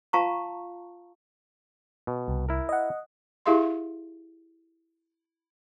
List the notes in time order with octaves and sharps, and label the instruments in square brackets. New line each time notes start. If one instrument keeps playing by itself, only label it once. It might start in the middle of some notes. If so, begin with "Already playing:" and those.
[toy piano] F4 F5 A5 A#5 C#6
[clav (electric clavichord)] B2
[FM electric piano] C2
[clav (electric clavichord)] E4 A#4
[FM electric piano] D#5 F#5
[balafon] E4 G4 G#4 E5 F5 C6